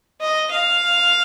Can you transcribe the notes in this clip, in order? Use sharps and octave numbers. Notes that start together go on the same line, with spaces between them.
D#5
F5